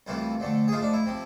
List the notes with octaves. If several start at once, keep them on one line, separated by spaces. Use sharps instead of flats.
C2 C3 E3 A3 F4
F2 D3 A3
G#4
G#2 F3 A3 F4
D4
E4
C3 F3